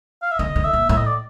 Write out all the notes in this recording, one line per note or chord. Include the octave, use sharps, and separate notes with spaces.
F5
E5
D3 D#5
D3
E5
A#2
A2 E5
D#5
D5